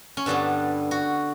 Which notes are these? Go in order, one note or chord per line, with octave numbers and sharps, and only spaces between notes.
C#4
G2 D3 G3 B3 D4
F#4